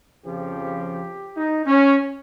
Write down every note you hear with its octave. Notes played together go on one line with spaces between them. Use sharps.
F2 C#3 F3 G4
D#4
C#4